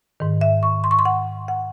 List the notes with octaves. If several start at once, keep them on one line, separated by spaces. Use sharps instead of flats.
G#2 D#3
E5
C#6
C6
C#6
C6
F#5
F#5